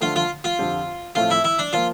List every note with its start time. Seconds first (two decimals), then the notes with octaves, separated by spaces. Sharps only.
0.01 D3 F3 A3 F4
0.16 F4
0.44 F4
0.59 F2 D3 F3 C4 G4
1.15 A2 F3 A3 C4 F4
1.30 E4
1.44 E4
1.59 D4
1.73 F3 A#3 F4